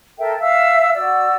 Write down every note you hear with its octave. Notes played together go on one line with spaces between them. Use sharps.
A4 A#4 E5 G5
E5 F5 E6
F#4 D5 E6